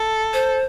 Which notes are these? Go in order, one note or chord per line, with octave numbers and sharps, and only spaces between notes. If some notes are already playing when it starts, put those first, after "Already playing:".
Already playing: A4
C5